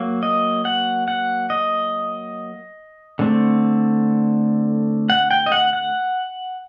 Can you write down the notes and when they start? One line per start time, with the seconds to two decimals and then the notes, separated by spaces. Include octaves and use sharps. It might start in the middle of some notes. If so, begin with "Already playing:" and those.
Already playing: F#3 A#3
0.23 D#5
0.65 F#5
1.08 F#5
1.50 D#5
3.19 D3 A3 C4
5.10 F#5
5.31 G5
5.46 D#5
5.52 F#5
5.73 F#5